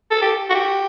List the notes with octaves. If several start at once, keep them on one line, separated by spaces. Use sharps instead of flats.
A4
G4
F#4
G4